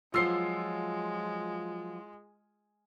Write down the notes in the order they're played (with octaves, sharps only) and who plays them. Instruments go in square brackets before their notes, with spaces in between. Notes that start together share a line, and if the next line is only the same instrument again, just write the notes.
[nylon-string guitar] F3 F#3 C5 [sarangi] G#3 [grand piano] F4 E6 C7